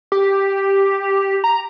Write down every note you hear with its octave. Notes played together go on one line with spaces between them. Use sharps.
G4
A#5